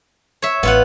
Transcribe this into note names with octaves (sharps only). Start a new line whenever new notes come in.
C#5 E5
A1 B3 F4 F#5